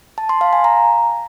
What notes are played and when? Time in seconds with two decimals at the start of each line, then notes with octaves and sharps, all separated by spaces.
0.18 A5
0.29 C6
0.41 F5
0.53 G#5
0.64 A#5